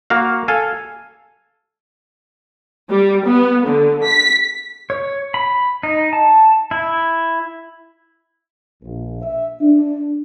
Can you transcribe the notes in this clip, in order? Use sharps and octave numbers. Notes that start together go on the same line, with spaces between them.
A#3 F#4 F5
A4 F5 G#5
G3
B3
D3
B6
C#5
B5
D#4
A5
E4
A#1
E5
D4